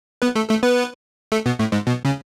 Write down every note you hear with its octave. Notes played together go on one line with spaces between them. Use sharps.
B3 B4
A3 A4
A3 A4
B3 B4
A3 A4
B2 B3
A2 A3
G#2 G#3
B2 B3
C#3 C#4